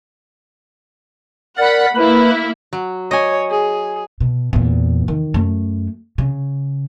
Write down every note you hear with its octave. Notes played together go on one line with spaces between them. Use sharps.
A#4 D5 F#5 B5
A#3 E4 B4 B5
F#3
C#5 D#5 G#5
G#4
B2
E2 A#2
D#3
F#2 A3
C#3